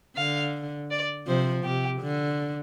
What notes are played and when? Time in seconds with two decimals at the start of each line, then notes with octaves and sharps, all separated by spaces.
0.17 D3 F5
0.91 D5
1.27 C3 F3 C5
1.64 C3 G4
2.01 D3